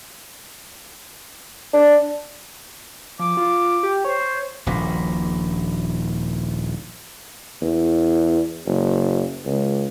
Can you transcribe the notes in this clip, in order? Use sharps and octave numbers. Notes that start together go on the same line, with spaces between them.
D4
F3 D6
F4
G4
C5 C#5
D#1 A#1 A#2
E2
F#1
C#2